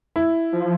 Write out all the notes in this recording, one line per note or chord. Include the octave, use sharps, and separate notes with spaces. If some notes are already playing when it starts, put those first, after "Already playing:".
E4
F3